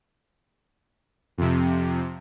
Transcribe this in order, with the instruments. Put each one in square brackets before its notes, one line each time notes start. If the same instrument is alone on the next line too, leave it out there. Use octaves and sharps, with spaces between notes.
[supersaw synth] F2 C3